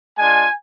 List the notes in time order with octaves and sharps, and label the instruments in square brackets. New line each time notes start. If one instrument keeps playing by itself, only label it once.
[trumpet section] G#3 D4 F4 G#5